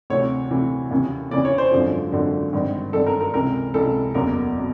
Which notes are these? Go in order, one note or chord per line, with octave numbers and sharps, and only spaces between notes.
D2 C3 E3 C#5
D2 C3 E3
D#2 C#3 E3
D#2 C#3 E3 D5
C#5
C5
G#1 F#2 D3 F3
G#1 F#2 D3 F3
G#1 G2 D#3
G#1 G2 D#3 A4
A#4
A#4
C#2 C3 E3 A#4
C#2 C3 E3 A4
F#1 E2 B2 A#4
B2